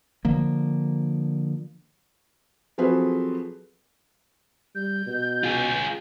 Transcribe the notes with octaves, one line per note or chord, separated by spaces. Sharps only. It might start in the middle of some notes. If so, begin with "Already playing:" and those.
D3 F3 A#3
F3 F#3 C4 G#4 A4 B4
G3 G6
B2
F4 G#4